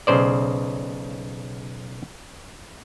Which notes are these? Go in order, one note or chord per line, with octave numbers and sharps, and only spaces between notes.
B1 C#3 C5 D5